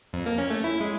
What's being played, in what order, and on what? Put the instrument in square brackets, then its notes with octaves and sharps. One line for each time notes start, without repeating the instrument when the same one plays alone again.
[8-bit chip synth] F2
A#3
C#4
A3
E4
G#3